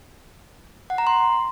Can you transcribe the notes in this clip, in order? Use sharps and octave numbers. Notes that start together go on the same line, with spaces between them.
F#5
A#5
C6